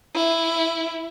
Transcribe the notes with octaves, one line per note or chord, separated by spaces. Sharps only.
E4